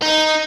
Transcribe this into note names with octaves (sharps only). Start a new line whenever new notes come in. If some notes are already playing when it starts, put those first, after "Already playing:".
D#4